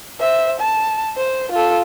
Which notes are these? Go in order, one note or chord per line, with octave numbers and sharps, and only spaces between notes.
C5 E5
A5
C5
F4 A4